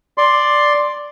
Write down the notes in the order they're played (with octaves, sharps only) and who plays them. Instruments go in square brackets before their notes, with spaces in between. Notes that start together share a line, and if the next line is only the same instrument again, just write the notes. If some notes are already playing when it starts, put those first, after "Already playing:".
[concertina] D5 C6